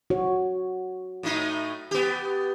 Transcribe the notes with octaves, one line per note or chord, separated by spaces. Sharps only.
F#4 C#5
A2 A3 D#4
B3 G4